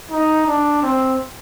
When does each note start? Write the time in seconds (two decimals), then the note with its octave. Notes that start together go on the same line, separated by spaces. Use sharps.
0.11 D#4
0.47 D4
0.82 C4